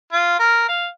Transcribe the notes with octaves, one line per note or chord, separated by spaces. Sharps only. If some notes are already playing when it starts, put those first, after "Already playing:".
F4
A#4
F5